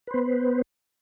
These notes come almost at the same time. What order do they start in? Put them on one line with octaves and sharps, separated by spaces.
B4 C5 B3